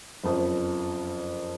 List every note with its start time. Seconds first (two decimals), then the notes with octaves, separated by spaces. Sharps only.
0.24 F#1 F2 F3